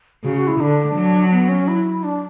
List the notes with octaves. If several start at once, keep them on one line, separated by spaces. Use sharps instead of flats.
C#3 F#4
F#4
E4
D3 D4
F#3
B3
C#4
E4
D4